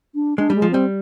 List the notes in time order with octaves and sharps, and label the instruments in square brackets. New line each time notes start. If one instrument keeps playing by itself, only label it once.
[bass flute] D4
[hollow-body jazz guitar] G#3 [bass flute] D4
[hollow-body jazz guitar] G3 [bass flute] G#3
[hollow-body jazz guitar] F3
[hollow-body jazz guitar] G3 [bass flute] C4